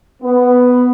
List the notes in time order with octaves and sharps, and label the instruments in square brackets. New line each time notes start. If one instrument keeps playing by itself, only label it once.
[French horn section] B3